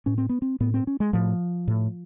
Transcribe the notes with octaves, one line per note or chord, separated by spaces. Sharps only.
A2 C#4
C4
B3
C4
A2 B3
C4
C#4
G#3
A2 F3
A2